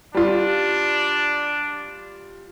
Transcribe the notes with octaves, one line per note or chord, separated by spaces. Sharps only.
G3 D4 F4